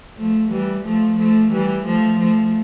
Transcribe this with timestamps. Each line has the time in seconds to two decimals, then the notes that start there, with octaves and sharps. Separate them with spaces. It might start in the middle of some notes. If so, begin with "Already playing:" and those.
0.17 F3 A3
0.51 E3 G3
0.85 F3 A3
1.18 F3 A3
1.52 E3 G3
1.85 F3 A3
2.19 F3 A3